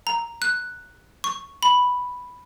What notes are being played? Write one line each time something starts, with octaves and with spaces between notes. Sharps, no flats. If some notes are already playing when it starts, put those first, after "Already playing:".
A#5
F#6
C#6
B5